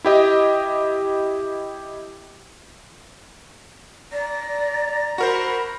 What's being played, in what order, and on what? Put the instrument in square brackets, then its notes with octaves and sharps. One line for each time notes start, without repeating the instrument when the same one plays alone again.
[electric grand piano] E4 G4 D#5
[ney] D5 [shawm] A#5
[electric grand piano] F#4 A#4 C5 [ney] B5